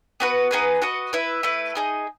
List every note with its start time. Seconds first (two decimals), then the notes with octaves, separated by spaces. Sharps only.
0.20 B3 F#4 B4
0.51 B3 D#4 G#4 B4
0.82 F#4 B4 D#5 F#5
1.13 E4 B4 E5
1.43 A3 E4 B4
1.75 D#4 G#4 D#5